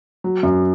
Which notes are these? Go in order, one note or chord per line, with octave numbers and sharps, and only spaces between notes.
F#3
F#2